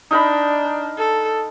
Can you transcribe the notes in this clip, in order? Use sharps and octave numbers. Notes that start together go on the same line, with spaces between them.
D4 D#4 A#4 B5
A4